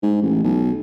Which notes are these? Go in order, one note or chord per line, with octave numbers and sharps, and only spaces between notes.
G#2
A1
B1